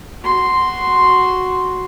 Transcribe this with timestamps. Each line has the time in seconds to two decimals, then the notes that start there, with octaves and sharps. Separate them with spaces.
0.23 F#4 C6